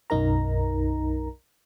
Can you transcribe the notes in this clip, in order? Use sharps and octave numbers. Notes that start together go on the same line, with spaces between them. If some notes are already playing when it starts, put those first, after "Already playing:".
B1 F#2 D#4 A#4 A#5